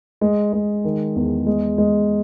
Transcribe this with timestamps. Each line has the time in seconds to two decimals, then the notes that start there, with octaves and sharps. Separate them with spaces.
0.21 G#3
0.53 G#3
0.84 D#3
1.16 E2
1.47 G#3
1.78 G#3